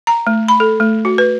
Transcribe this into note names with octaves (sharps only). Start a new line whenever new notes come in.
A#5
A3
B5
A4
A3
F#4
B4